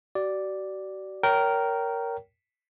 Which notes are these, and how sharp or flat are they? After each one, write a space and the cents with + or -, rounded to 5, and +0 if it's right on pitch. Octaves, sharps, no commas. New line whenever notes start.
F#4 +45 D5 +0
A#4 +0 C#5 +20 G5 -20